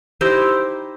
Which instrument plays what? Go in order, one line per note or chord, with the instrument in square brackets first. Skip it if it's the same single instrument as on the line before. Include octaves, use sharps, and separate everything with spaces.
[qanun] D#4 E4 G4 C5